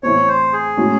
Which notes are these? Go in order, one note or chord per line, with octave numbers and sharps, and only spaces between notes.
A2 E3 A3 C4 C#5
C5
G#4
A2 G#3 C#4 F#4